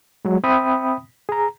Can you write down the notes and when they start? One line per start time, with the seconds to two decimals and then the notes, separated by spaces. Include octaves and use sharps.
0.25 F#3 G#3
0.44 C4 E5 G5 B5 D#6
1.29 G#4 A#5